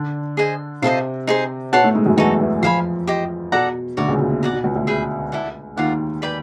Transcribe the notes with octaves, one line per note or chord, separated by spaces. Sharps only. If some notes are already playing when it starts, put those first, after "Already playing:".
Already playing: D3 D4
G#4 C5 D#5 G#5
C3 C4 F4 A4 C5 D#5
D#4 G#4 C5
B2 B3 C#5 F#5 A5 C6
A2 A3
G#2 G#3
F#2 F#3
E2 E3 D#4 F#4 A4
E2 E3
F2 F3 C5 F5 G#5 B5
G4 C5 D#5
B2 A4 D5 F#5 A#5
D2 D3 F#4 A#4 D5
C#2 C#3
B2
A#2
B2 D5 F#5 A#5
B2
C#2 C#3
D2 D3
G#4 B4 E5 G5
E4 A4 D5 F#5
D#2 D#3 F4 A#4 D5 F#5
B4 D5 G5 B5